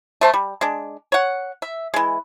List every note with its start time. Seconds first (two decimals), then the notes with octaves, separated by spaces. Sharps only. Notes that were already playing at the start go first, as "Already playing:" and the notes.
0.21 A3 C5 A5
0.34 G3
0.61 G#3 D4
1.12 C#5 F#5
1.62 E5
1.94 E3 G#3